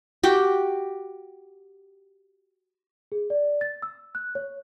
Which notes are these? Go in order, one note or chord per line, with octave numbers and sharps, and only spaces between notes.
F#4 G4 G5
G#4
D5
A6
E6
F#6
C#5